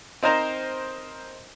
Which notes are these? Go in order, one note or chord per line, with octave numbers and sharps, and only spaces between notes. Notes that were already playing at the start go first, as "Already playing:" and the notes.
C4 D#4 A#4 C5 A#5